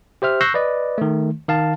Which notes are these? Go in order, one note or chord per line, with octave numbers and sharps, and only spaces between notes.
G4 C5 E5 F6
C#6 E6 F#6 G6 A#6 C7
B4 D5 D#5
D#3 A3
D#3 F5 A5